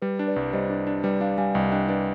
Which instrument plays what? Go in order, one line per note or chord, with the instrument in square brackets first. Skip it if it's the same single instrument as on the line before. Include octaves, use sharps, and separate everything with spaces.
[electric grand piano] G3 [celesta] B4
[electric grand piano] D4
[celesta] B4 D5
[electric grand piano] C2
[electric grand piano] G3 [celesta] C5 D#5
[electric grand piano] D4
D4
[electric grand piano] G3 [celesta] B4 D5
[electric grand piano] D4 [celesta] D5 F5
[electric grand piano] G3 [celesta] F5 G#5
[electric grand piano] C2 [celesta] D#5 G5
[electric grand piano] D4 [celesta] D#5 G5
[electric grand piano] D4 [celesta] B4